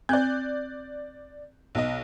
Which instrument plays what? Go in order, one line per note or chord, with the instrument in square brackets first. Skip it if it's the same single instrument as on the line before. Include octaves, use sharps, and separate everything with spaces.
[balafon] C4 [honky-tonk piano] D5 F#6 G6
[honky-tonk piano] B1 D#5